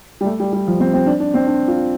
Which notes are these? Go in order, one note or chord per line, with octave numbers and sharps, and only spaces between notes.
G3
A3
G3
G3
F3
C4
C4
D4
D4
C4
D4
F4